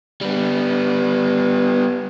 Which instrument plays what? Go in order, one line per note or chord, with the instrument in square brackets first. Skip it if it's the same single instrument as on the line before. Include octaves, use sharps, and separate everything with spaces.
[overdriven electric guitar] G3 B3